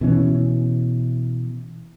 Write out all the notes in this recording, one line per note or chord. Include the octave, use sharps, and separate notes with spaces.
B2 E3 C#4